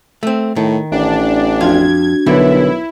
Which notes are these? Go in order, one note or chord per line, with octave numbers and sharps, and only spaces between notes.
A3 C4
A2 D#3
A1 D4
F2 D4 F4 F#4 G#6
B1 D3 F#3 G3 E4 A#4 B4 C#5